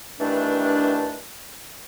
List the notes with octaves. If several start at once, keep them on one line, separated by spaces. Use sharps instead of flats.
G2 D#3 E3 A3 D4